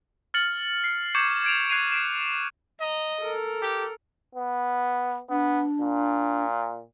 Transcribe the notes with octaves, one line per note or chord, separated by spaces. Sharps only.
F6 A6 C#7 F#7
C7
C#6 D6 G6 G#6 C#7 E7
G#6 D7 F7
F#6 G#6 C7 D7 D#7 F7
C7 D7 E7
D#5 A#5
A4 A#4
G4
B3
B3 D4
A#2